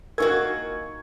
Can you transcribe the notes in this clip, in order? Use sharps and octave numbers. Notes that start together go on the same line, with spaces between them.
A#3 D#4 F4 F#4 A#4 G#5 C#6 G#6